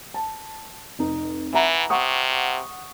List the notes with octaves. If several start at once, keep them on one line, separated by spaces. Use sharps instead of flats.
A5
F1 D#4
E3 E5 F#5 A#5
C3 F#5 C#6 D#6